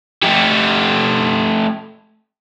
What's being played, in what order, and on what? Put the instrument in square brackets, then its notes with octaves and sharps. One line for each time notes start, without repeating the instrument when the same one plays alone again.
[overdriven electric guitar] A3 G4